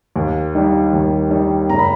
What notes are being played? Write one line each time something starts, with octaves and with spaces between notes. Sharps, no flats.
D#2
D#3 G3
D#2
D#3 G3
F#1 A#5
B5